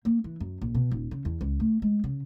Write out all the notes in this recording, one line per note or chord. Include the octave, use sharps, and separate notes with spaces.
A#3
E3
F#2
A#1
B2
D#1
C#3
E2
C#2
A3
G#3
C#3